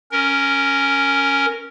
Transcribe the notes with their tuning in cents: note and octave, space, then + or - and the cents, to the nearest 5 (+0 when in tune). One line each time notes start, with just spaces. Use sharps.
C#4 +0 A#4 +0